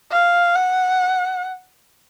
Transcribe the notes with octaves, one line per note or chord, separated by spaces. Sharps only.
F5
F#5